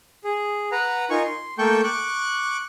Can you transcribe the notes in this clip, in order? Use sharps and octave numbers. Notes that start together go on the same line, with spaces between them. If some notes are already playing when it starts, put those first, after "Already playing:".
G#4
B4 F#5 A#5
D#4 F4 A#4 G#5 C#6
C6
A3 A#3 A4 G5 C#6 G6
C#6 D6 F#6